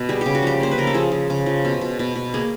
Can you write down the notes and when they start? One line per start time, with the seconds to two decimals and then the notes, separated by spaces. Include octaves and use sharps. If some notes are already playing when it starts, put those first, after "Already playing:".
Already playing: B2
0.09 G3 G#4
0.21 C#3 G4
0.35 F#4
0.43 F3 G4
0.60 A#3 C5
0.71 B4
0.78 C#3 A#4
0.87 A4
0.94 F3 G#4
1.12 F3
1.30 C#3
1.46 F3
1.65 B2
1.81 B2
1.99 B2
2.15 B2
2.34 A#3 G#4